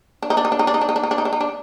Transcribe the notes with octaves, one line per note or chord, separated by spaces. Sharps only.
D4
D#4
D4
D#4
D4
D#4
D4
D#4
D4
D#4
D4
D#4
D4
D#4
D4
D#4
D4